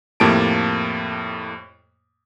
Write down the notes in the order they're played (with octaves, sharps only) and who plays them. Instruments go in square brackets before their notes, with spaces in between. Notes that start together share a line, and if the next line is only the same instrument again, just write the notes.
[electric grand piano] F2 A2 A#3 G4 A5 D7